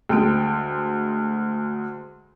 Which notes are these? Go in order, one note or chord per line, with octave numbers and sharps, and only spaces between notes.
D2 G#3 G5 D7